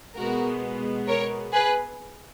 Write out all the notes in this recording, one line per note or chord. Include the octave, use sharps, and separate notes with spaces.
B2 G#3 B3 F#4 A#4
A#4 C#5
G#4 B4